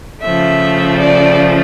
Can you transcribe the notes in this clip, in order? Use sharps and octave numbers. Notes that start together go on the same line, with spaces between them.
C#3 F3 A3 E5
D5